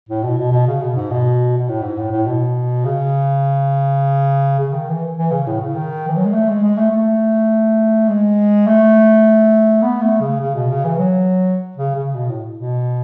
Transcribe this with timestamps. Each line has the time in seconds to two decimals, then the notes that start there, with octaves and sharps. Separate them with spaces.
0.09 A2
0.23 B2
0.38 B2
0.52 B2
0.67 C#3
0.82 B2
0.96 G#2
1.11 B2
1.58 B2
1.69 A2
1.82 G#2
1.98 A2
2.11 A2
2.26 B2
2.85 C#3
4.59 C#3
4.73 D#3
4.89 E3
5.17 E3
5.31 C#3
5.47 A2
5.60 C#3
5.75 D#3
6.08 E3
6.16 F#3
6.25 G#3
6.33 A3
6.49 G#3
6.63 G#3
6.78 A3
6.91 A3
8.08 G#3
8.67 A3
9.82 B3
10.01 A3
10.21 C#3
10.40 C#3
10.55 B2
10.70 C#3
10.85 E3
10.98 F#3
11.77 C#3
11.96 C#3
12.15 B2
12.29 A2
12.59 B2